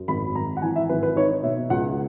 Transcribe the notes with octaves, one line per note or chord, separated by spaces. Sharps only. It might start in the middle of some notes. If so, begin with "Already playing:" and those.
Already playing: F#2
G#1 B5
G#1 A#5
F#5
E3 G#5
E5
G#1 B4
B4
D#4 C#5
B2 E5
C#2 F#5